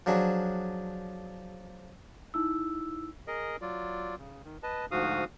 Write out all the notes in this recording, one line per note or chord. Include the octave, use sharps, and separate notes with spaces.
F3 F#3 D4 G#4
D#4 E4 E6
G#4 A#4 D#5
F#3 F4 D5
C#3
D#3
B4 D#5 A5
D2 G#2 F3 F#4 F5 D#6